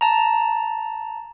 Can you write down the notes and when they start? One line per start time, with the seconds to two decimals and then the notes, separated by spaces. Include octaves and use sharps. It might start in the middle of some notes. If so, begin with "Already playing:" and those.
0.01 A5 A#5